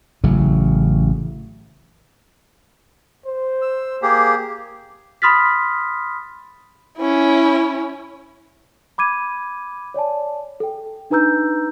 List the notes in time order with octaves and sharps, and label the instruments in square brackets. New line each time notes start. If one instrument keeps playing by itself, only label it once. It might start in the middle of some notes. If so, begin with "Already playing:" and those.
[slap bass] A1 C#3 F#3
[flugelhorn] C5
[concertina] E6
A#3 G4 G#4
[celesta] B5 C6 D#6 F6 A6 B6
[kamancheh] C#4 E4
[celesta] B5 D6 G#6 D#7
C#5 D5 G#5 A5
A4 G5
D4 D#4 B4 A#5 E6 G6